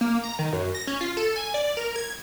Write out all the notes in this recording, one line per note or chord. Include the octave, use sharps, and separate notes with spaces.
A#3
A#5
D#3
F#2
A#6
C#4
F4
A4
G#5
D5
A#4
G#6